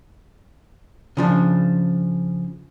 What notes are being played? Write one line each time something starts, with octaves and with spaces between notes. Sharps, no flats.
C#3 F3 D4